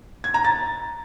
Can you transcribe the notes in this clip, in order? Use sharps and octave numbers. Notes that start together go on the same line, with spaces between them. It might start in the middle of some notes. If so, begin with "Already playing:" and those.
G#6
A#5
A6